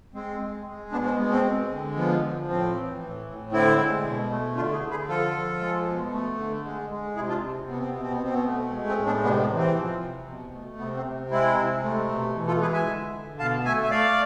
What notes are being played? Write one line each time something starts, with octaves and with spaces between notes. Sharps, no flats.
G#3 C4
G#3
G#3
B2 B3 D4
C4
G#3 B3
C4
G#3
D3
F3 B3
F3
A2 C4
E3
A2
A2
D3 C4 E4
G#3
B2
A3
D3 D4 F4
E4 G#4
D3
G#4 B4
F3 F4 A4
F3
G#3
B2
A3
D3
G#3
G#3
C3 E4 G#4
D4 F4
C3
B2 B3
C4
B2 B3
C4
B3
B2 C4
B3
A3
G#3
C4
A2
B3 D4
C3 B3 D4
B3
E3
C4
F3
C3
B2
A3
C3 B3
C4
C3
G#3 C4 E4
C3
A3
B2
E3
F4 A4
G#3 G#4 B4
E5 G#5
D3
D3
B2 F5 A5
A3 E5 G#5
E5
A3 D5 F5